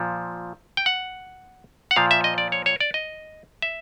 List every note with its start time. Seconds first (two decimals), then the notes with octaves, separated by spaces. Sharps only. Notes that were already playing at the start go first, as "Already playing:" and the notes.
Already playing: A#2 F3
0.77 G5
0.86 F#5
1.91 F#5
1.96 A#2 F3 F5
2.11 E5
2.24 D#5
2.38 D5
2.52 C#5
2.66 C#5
2.80 D5
2.94 D#5
3.62 E5